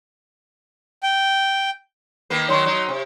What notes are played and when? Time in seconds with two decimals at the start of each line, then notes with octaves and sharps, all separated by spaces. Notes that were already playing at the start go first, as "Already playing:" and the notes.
1.03 G5
2.30 D#3 A#3 B4 B6 C7
2.48 D#3 F#3 D#4 C#5 C6 C#6
2.66 F#3 D#4
2.88 C3